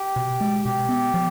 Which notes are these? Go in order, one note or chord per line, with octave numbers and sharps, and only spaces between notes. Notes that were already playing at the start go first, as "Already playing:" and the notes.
Already playing: G4
B2
G#3
B2 G4
B3
F3